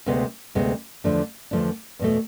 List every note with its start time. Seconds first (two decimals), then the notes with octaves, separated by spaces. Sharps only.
0.06 D2 C3 G#3 B3
0.55 D2 C3 G#3 B3
1.04 E2 D3 F3 A3 D4
1.51 E2 D3 F3 A3 D4
1.99 E2 B2 A3